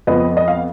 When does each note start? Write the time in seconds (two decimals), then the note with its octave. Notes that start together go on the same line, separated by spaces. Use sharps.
0.07 F2 F3 B3 B4 D#5
0.37 D#5
0.48 F5